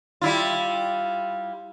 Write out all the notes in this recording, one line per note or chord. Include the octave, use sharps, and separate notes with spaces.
G3 E4 F4